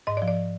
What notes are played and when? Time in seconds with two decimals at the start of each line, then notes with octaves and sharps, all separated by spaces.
0.07 G#2 D#5
0.17 D5
0.22 F3
0.28 D5